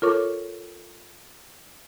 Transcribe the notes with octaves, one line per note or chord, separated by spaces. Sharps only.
F4 A4 A#4 C#5 C#6 D6